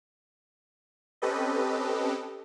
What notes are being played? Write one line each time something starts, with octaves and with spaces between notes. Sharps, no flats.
C4 C#4 G4 A4 B4 D#5